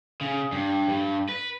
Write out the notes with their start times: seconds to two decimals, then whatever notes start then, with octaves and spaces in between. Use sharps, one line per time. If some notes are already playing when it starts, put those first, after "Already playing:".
0.21 C#3
0.52 G2
0.89 G2
1.29 B4